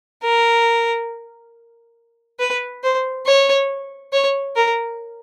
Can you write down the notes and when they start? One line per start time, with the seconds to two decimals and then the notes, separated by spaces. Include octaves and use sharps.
0.23 A#4
2.39 B4
2.83 C5
3.26 C#5
4.13 C#5
4.56 A#4